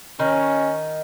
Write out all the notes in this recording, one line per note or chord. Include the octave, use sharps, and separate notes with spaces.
D#3 C#4